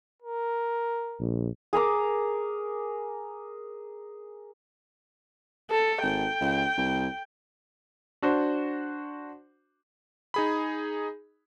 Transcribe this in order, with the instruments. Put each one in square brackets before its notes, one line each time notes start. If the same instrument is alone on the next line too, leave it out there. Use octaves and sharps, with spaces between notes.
[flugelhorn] A#4
[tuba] A#1
[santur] G#4 A#4 A#5 D6
[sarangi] A4
[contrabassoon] G#1 [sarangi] G5
[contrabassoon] C#2
C2
[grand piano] D4 F#4 C5
[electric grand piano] D#4 G#4 B5